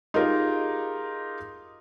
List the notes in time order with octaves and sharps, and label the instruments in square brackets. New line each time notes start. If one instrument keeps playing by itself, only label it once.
[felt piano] D#4 F4 G4 G#4 A#4 D#5